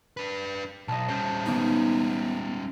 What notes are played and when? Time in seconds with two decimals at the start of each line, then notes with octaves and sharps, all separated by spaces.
0.17 D4 B4
0.88 B1 D#5 A5
1.09 G3 C#4 C5
1.46 G#3 A#3 B3 D#4